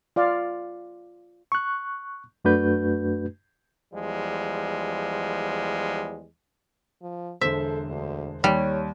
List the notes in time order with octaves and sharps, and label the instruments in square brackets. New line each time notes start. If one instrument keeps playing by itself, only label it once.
[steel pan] F4 D5 F5
[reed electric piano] C#6 F#6
F#2 A3 D4 F#4 B4 G6
[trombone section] E2 F3 G3 G#3
[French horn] F3
[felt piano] E1 D3 C5 [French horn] A4 [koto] E5
[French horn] D2
[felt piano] D#2 [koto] G3 [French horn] C#5